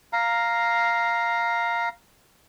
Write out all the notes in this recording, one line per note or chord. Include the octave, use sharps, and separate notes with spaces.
F5 A#5